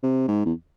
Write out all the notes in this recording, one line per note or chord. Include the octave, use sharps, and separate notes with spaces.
C3
G#2
E2